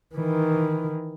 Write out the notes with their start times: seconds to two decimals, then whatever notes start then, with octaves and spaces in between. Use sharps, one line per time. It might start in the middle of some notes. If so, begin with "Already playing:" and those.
0.15 D#3 E3